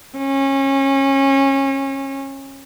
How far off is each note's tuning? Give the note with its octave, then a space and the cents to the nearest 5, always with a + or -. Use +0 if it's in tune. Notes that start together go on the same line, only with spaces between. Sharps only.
C#4 -25